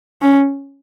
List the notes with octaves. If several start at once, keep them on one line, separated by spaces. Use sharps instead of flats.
C#4